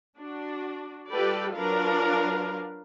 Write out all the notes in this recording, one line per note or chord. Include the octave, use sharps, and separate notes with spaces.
D4 F#4
G3 F4 G4 A4 B4 D5
F#3 D4 F4 A#4 B4 F5